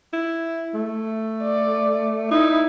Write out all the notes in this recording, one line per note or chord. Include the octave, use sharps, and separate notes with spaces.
E4
A3
D5
D#4 E4